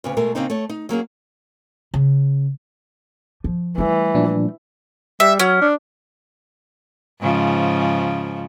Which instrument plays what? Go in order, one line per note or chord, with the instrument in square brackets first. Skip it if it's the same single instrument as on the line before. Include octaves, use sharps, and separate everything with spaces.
[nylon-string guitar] D2 C#3 B3
B2 G#3 A3 A#4
C#3 A#3 C4 D4 D#4
A3 C#5
D#4
F#3 A#3 C#4 G#4
[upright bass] C#3
F3
[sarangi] E3 [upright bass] G3 A3
[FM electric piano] A#2 F3 D4
[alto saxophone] G3 [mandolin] E5
[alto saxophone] F#3 [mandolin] C#4
[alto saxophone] D4
[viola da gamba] G#2 C#3 F3